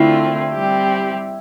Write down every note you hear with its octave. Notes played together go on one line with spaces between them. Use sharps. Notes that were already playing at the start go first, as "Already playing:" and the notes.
Already playing: D3 A3 C4 E4 F4
G3 C4 G4